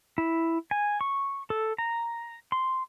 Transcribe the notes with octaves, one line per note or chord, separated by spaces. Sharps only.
E4
G#5
C#6
A4
A#5
C6